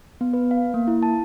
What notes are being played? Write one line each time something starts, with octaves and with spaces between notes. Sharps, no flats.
B3
B4
F5
A#3
E4
A5